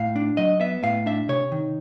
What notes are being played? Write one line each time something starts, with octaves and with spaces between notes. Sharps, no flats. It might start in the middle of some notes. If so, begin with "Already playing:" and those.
Already playing: A2 F5
D4
F#3 D#5
B3 E5
A2 F5
D4 E5
C3 C#5
D#3